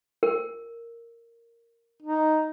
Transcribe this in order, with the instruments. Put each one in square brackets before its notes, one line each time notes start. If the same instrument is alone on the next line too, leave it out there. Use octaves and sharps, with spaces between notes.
[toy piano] A#4
[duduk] D#4